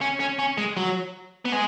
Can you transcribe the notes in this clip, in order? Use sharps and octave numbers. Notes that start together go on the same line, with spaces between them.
C#4
C#4
C#4
G#3
F#3
B3
G#3